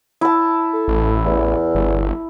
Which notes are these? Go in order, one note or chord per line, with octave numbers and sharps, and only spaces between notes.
E4 A5
A4
A1
E2
G1